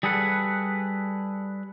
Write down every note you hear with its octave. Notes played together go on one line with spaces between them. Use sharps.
G3 G#4 A4 B4 F#5